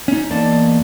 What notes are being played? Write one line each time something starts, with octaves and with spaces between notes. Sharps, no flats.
C#4 D#4
E2 A#3 D5 D#5 A5